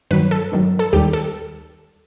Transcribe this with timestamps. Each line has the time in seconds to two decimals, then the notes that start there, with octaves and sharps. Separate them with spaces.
0.11 G2 D#3 F#3 B4
0.31 A4
0.52 G2 D#3 F#3
0.79 A4
0.93 D#2 D#3 G3 G4
1.13 A4